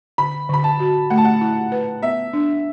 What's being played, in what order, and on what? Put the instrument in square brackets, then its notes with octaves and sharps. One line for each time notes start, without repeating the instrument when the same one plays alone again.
[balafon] D3 [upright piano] B5
[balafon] D3 [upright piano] B5
[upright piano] A5
[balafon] F#4
[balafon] A3 [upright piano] F#5
[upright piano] A5
F#5
[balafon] E4
B4
[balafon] B3 [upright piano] E5
[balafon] D4